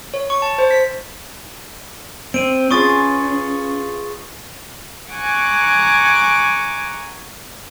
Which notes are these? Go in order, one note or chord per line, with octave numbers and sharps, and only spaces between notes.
C#5
C#6
A5
C5
B6
C4 D7 D#7
C#4 F4 G#4 B4 C#6 D#6 A6
F#5 G#5 A#5 C#6 D6 F#6